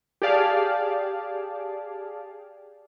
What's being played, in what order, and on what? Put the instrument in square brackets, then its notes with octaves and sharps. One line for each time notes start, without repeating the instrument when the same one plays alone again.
[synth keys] G4 G#4 D5 F5 A5